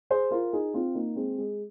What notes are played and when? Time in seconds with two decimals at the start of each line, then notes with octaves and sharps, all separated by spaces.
0.10 G#4 C5
0.31 F4 A#4
0.53 D#4 G#4
0.74 C4 F4
0.95 A#3 D#4
1.16 G#3 C4
1.38 G#3